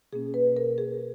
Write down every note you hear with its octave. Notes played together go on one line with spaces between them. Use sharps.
B2 A#3 C#4 G#4
B4
A#4
G#4